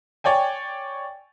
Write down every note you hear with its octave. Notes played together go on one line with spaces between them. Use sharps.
C#5 D5 G5 G#5